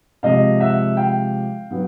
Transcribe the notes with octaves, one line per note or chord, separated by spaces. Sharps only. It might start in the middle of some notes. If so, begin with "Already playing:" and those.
C3 F3 G#3 D#5 F5
E5 F#5
F5 G5
F#3 B3